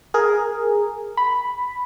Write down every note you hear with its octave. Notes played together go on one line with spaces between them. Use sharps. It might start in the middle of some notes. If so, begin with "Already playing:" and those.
G#4 A#4
B5